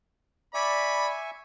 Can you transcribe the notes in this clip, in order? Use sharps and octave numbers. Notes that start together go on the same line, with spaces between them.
D5 E5 G#5 B5 C#6